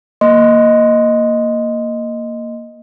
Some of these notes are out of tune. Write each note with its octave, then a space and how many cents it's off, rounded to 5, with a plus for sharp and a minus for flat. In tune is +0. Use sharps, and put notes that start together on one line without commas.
A#3 +0 D#5 +0 C6 -10